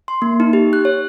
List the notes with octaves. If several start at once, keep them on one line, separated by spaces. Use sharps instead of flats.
C6
A#3
D#4
G4
F#6
C#5